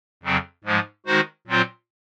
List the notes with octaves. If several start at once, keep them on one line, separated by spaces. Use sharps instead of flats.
F2 C#3 F#3 C4
G#2 F3 G#3
D#3 G#3 D#4 F#4 C5
A#2 F#3 C4 F4 C5